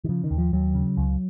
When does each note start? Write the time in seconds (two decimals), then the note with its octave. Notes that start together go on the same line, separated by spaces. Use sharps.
0.04 D#3
0.09 C#3 F3
0.24 D#3
0.31 D#2
0.38 F3
0.53 D#2 F#3
0.75 C#3
0.97 C#2